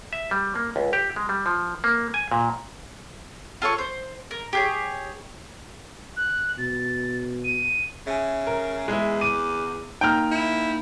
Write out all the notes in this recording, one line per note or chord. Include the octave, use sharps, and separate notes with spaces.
E5
G3
A#3
C#2
G4
G#3
G3
F3
A#3
G#5
A#2
F4 A4 C#5 C#6
C5
A#4
G4 G#4 C#5
F#6
B2 A6
D#7
C#3 E5 G#5
A#4
E2 G#3 E4
D6 D#7
A#3 D#4 G5 A#5 F6
E4